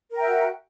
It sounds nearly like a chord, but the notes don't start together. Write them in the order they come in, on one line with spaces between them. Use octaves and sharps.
A#4 G5 E5 F#4